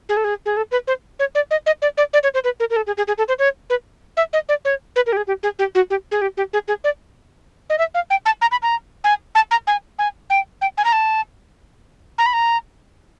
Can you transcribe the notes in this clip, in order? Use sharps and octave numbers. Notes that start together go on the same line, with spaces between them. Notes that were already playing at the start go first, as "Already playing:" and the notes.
G#4
A4
G#4
G#4
A4
B4
C5
C#5
D5
D#5
D#5
D5
D5
D5
C#5
C5
B4
A#4
A#4
A4
G#4
G#4
G#4
A4
C5
C#5
B4
E5
D#5
D5
C#5
B4
A#4
G4
G#4
G4
G#4
G4
F#4
G4
G#4
G4
G4
G#4
G#4
D5
D#5
E5
F5
G5
A5
A#5
B5
A#5
G#5
A5
A#5
G#5
G#5
G5
G5
G#5
A#5
A5
A#5
B5
A#5